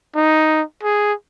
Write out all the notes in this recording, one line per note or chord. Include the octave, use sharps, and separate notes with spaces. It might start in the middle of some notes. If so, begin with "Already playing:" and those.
D#4
G#4